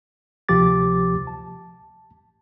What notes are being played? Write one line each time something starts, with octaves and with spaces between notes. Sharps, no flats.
D2 C3 F3 G4 D6 A6
A5